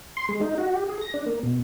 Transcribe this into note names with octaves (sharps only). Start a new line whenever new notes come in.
C6
G#3
D#4
F#4
G4
G#4
A#6
D4
A#3
B2